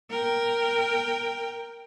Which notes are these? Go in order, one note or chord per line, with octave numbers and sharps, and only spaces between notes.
A#4 G5